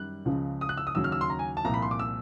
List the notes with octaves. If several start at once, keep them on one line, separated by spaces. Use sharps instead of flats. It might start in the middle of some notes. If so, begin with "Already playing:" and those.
Already playing: F#2 D#3 G3 F#6
C#2 C#3 F3
D#6
F#6
E6
D#6
D#2 C#3 F#3 E6
F6
E6
C6
A#5
G#5
A5
C2 A#2 F3 A#5
B5
C6
D6
E6